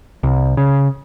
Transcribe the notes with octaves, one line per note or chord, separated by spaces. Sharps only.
C2
C#3